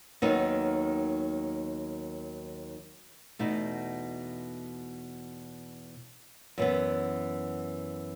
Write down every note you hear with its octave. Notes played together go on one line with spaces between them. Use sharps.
D#2 D#3 F#3 B3 D#4
E2 B2 A3 D#4
F#2 E3 B3